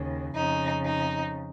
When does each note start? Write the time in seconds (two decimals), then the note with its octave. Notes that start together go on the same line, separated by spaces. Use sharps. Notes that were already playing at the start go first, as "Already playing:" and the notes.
Already playing: D#2 C#3
0.35 F2 C#3 D#4
0.85 D#4